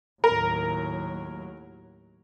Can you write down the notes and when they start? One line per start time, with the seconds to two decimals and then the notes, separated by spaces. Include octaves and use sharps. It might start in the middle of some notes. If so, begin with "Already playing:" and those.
0.24 D#2 A2 F#3 A#4